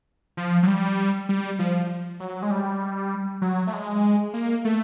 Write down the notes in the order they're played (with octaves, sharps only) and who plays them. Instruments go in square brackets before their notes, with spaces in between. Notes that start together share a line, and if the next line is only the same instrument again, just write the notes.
[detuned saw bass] F3
F#3
G3
G3
F3
F#3
G#3
G3
F#3
A3
G#3
A#3
A3